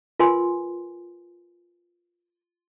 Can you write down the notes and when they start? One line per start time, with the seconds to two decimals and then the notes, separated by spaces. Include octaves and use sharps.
0.20 F4 A#4 B4 G#5 C6